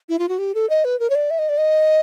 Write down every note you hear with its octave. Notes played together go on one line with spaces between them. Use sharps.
E4
F4
F#4
G4
A4
D#5
B4
A#4
C#5
D5
E5
D#5
D5
D#5